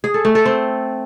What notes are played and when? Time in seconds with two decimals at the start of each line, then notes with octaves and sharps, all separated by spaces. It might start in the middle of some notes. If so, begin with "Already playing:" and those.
0.04 G#4
0.14 A4
0.25 A3
0.35 A4
0.46 C4